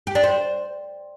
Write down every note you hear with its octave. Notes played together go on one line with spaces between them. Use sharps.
G4
D4
C5